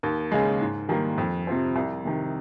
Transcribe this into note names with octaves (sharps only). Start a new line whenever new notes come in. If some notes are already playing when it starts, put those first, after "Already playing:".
D#2
C#3 G#3
G#2
D#3 G3 A#3
F2
C3 F3 C4
C2
C3 D#3